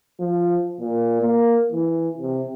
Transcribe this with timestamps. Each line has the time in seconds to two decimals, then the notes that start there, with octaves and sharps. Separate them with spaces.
0.20 F3
0.80 A#2
1.21 A#3
1.72 E3
2.18 C3